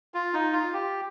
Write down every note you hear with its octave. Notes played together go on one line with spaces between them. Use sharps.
F4
D#4
F4
G4